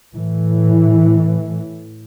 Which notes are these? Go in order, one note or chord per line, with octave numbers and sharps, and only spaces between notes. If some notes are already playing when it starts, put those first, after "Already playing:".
A2 E3